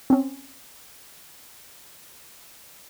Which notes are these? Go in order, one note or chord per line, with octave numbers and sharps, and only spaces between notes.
C4 C#4